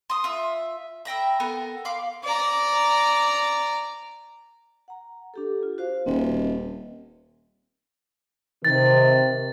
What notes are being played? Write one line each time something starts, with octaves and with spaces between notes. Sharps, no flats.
C6 D#6
F4 E5
E5 G5 A#5 B5
B3 A4 A#4
F5 B5 C6 D6
D5 A#5
F#5 A#5
D4 G4 A4
F4
F#4 C5 F5
D#1 C4 D#5 E5
C3 D#3 A6